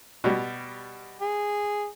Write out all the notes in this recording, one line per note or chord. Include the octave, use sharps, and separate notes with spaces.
B2 G3
G#4